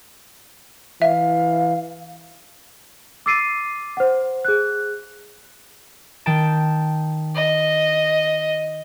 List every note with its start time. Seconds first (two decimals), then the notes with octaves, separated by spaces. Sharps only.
1.02 E3 E5 F5
3.26 D6 E6 A6 C7 D7 D#7
3.97 C5 F#5
4.45 G#4 F#6
6.26 D#3 G5 A5
7.35 D#5